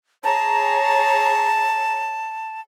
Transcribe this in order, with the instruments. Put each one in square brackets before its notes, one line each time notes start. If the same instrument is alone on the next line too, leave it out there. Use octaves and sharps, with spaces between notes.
[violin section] G#4 C#5 A#5 [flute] A5